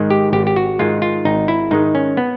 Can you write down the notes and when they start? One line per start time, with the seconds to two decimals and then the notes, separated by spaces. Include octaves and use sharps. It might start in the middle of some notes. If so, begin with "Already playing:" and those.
Already playing: G#2 D#3 G#3
0.10 G4
0.33 G#1 G4
0.47 G4
0.56 F#4
0.79 G#2 D#3 G#3 F4
1.02 F4
1.25 G#1 D#4
1.48 E4
1.71 G#2 D#3 G#3 D#4
1.95 C#4
2.17 B3